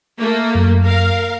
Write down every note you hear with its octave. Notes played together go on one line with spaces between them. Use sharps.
A3 A#3
F#2
A#4 F5